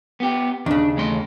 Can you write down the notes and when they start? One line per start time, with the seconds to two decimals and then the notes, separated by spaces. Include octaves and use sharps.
0.20 B3 G4
0.66 D#2 C#3 D4
0.97 E3 A3 C6